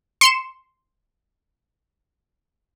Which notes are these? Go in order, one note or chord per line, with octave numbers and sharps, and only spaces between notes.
C6 C#7 E7